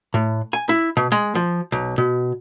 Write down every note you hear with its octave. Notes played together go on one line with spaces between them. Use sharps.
A2
G#5
E4
B2
G#3
F3
B1
B2